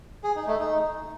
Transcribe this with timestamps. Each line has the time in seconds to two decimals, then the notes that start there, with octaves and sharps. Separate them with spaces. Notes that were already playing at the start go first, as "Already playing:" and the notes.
0.24 G#4
0.36 D#4
0.47 A3
0.59 D#4